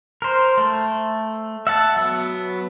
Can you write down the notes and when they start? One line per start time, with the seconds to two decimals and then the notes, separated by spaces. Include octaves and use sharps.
0.22 A#4 C5
0.58 A3
1.67 E5 F#5 A5
1.96 F#3 B3